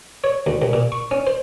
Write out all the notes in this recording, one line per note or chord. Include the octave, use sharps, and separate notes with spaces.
C#5
D2
C2
A#2
C#6
C#4
C5